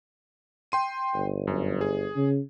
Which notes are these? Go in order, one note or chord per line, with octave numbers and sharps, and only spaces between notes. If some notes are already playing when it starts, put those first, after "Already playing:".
G5 C6 D#7
G1
F#2
G#4
C#3